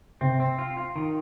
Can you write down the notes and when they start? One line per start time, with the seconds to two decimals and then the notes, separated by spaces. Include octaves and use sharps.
0.21 C3 C4
0.40 C4
0.59 F4
0.77 F4
0.96 D#3